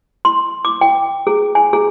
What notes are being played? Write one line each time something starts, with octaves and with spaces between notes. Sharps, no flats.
C6
D6
G5
G#4
G#5
G#4